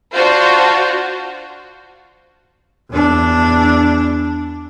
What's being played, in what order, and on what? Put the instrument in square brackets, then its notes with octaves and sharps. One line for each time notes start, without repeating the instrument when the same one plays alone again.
[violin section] D4 F4 F#4 C5
[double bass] E2 D4